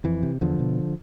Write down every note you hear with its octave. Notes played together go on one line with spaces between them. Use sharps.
F2 E3
C3
E2 D3 F3
B2